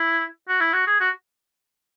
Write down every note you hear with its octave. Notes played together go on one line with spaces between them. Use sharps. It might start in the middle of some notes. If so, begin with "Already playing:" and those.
Already playing: E4
F#4
E4
F#4
G#4
F#4